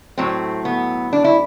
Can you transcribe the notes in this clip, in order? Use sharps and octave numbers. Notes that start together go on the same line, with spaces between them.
A2 F#3 A3 C4
B3
D4
E4